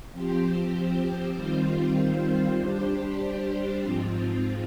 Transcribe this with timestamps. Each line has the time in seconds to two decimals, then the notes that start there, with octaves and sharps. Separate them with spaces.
0.12 F3 C4 G4 C5
1.35 D#3 G3 C4 F4 C5
2.58 G3 D4 G4 C5
3.81 G#2 F3 C4 F4